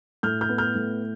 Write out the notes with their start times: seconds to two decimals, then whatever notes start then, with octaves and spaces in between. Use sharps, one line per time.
0.23 A2 F6 G6
0.41 F6 G6
0.49 B3
0.58 F6 G6
0.75 A2